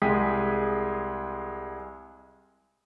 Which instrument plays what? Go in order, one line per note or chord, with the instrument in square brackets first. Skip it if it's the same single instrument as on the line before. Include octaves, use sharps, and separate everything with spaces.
[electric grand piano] C2 G#3 G#4 G5 D#6 B6